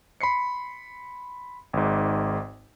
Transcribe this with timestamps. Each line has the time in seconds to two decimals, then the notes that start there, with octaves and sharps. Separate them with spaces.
0.21 B5 C6 C7 C#7
1.73 G#1 G#2